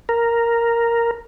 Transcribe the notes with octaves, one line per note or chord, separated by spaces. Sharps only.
A#4